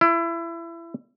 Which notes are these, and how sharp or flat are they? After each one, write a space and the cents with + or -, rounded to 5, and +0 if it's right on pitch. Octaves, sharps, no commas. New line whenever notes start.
E4 +25